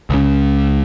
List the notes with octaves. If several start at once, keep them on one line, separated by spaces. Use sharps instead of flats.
C#2 C#3